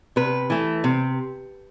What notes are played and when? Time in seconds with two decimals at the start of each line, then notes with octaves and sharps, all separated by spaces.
0.16 C3 B4
0.50 E3 A3
0.84 C3